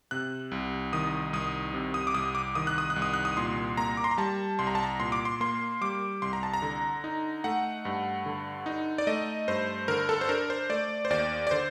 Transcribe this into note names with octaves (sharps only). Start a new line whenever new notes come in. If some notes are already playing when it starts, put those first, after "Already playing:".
C3 F#6
C2
D#3 D#6
C2 D#6
C3
D#6
D6
C2 D#6
D6
D#3 D#6
F#6
D#6
F#6
C2
D#6
F#6
D#6
A#2 C6
A#3 A#5
D6
C6
A#5
G3 A5
C2 C6
A#5
A5
A#5
A#2 C6
D6
C6
A#3 C6
G3 D6
C2 C6
A#5
A5
A#5
D3
D#4
A3 F#5
G2
D3
D#4
D5
A3 D#5
G2 C5
D3 A#4
A4
C5
D4 A#4
C5
A3 D5
C5
D#2 D5
D5
D3 C5